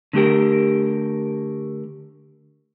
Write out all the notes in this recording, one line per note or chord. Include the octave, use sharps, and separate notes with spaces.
D3 A3 G4 A#4